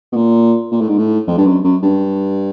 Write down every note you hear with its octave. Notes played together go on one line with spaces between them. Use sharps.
B2
A#2
A#2
A2
G#2
A2
F2
G2
F#2
F#2
G2